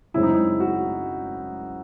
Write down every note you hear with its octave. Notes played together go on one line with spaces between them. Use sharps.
F#2 C#3 G#3 C4 E4
D#4
E4
F#4